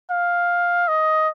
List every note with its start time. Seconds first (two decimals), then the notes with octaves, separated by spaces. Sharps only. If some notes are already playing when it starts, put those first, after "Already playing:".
0.10 F5
0.88 D#5